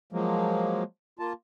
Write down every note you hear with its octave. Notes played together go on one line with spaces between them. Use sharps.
F3 F#3 G#3 A#3
A#3 F4 A5